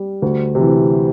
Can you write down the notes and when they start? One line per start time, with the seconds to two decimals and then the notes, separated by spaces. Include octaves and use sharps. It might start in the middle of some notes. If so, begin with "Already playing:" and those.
Already playing: G3
0.22 D2
0.55 C3
0.60 E3